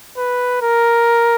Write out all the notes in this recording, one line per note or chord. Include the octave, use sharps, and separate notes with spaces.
B4
A#4